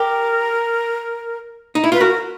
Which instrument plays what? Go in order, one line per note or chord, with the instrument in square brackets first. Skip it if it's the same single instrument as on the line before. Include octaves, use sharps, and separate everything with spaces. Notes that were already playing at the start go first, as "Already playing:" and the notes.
Already playing: [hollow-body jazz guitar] G4 [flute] A#4
[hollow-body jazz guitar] D#4
E4
[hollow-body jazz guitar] F4 [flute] B4
[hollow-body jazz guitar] F#4 [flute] A#4